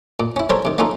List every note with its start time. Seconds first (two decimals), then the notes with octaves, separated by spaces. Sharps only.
0.20 A#2
0.36 C#4 E4
0.50 G3 A4 A#4 C5 C#5
0.65 C3 D#3
0.78 A#3 C#4 D#4 F4 A4